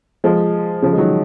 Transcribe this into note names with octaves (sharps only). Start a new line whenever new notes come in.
F3 G#3
C#3 F3
G#3
D#3 F#3